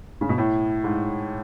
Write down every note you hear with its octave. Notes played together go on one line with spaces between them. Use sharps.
C#3
B2
A2
G#2